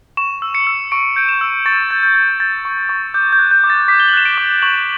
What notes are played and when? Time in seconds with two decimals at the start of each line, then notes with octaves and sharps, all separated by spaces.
0.17 C#6 E7
0.42 E6
0.55 C#7
0.67 E6
0.92 C#6 D7
1.16 G6 D7
1.29 E7
1.41 E6
1.66 C#6 A6
1.91 G6
2.03 G6
2.15 G6
2.40 G6 A6
2.65 C#6
2.89 C#6
3.14 D6 G6
3.33 G6
3.39 F#6
3.51 G6
3.64 D6
3.70 A6
3.88 D6 B6
4.00 G7
4.08 F#7
4.13 F#6 E7
4.25 D7
4.38 D6
4.62 C#6 F#7